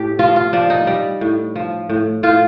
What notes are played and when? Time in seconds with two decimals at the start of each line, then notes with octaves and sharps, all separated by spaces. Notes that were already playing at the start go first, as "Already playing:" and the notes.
Already playing: A2 G4 A4
0.19 F3 F4
0.36 F4
0.53 F3 D4
0.70 D#4
0.87 G3
1.21 A2
1.56 F3
1.89 A2
2.23 A2 F4